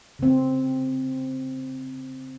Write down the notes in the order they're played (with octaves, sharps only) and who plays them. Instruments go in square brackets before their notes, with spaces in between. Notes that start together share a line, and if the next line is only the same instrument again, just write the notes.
[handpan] C#3 C4